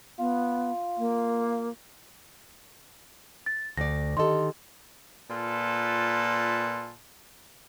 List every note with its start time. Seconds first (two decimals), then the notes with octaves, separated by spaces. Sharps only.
0.19 B3 F4
0.98 A#3
3.46 A6
3.77 D2 D5 A#6
4.17 D#3 G4 A4 D#5 C6
5.30 A#2 F4 A4 B4